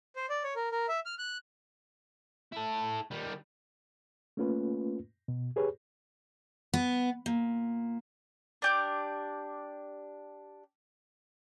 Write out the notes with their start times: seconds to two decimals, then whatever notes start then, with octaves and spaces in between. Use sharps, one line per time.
0.16 C5
0.30 D5
0.44 C#5
0.56 A#4
0.72 A#4
0.88 E5
1.06 F6
1.19 F#6
2.53 E4 A4
3.11 D#3 G3
4.37 A3 A#3 C#4 F4 B4
5.28 B2
5.56 G4 G#4 B4 C#5
6.74 B3
7.26 A#2
8.62 D4 G4 G6